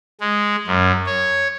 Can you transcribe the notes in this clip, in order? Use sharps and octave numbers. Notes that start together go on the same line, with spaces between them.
G#3
F#2
C#5